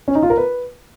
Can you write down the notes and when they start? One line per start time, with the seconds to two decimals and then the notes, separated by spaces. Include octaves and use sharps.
0.08 C#4
0.15 D#4
0.23 F4
0.30 A#4
0.37 B4